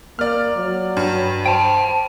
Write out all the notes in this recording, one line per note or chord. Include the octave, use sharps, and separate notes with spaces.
A#3 D5 F6
F#3
G2
C5 G5 A5 D7